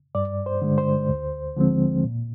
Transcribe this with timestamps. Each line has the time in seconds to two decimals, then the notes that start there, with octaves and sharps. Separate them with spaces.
0.15 G2 D5
0.46 C5
0.62 D3 G#3
0.78 C5
1.09 D2
1.56 D3 F3 G#3 C4
2.04 A#2